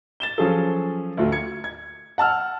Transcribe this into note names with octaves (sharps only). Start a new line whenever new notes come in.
A6 E7 G7
F3 F#3 C#4 F4 G#4 A4
D2 A3 F4 F#4
G#6 C#7
G#6
F#5 A5 E6 F6